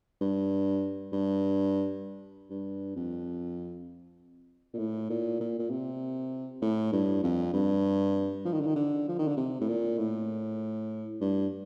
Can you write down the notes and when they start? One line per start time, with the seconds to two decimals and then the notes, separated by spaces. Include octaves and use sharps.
0.21 G2
1.13 G2
2.50 G2
2.96 F2
4.74 A#2
4.78 A2
5.10 A#2
5.40 A#2
5.58 A#2
5.70 C3
6.62 A2
6.92 G2
7.24 F2
7.54 G2
8.45 F3
8.53 D#3
8.61 D3
8.67 D#3
8.76 D3
9.08 F3
9.19 D#3
9.28 D3
9.37 C3
9.61 A2
9.68 A#2
9.98 A2
11.21 G2